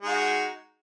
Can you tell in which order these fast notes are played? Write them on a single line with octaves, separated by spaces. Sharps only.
G#3 D#4 F#4